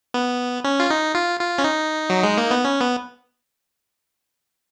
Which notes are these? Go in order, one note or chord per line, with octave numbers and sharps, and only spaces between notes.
B3
C#4
F4
D#4
F4
F4
C#4
D#4
F#3
G#3
A#3
B3
C#4
B3